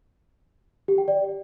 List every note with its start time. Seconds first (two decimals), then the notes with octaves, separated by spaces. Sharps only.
0.88 G4
0.98 G5
1.08 D5